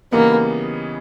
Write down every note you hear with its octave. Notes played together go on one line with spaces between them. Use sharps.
C#3 E3 G3 A#3 B3 D#4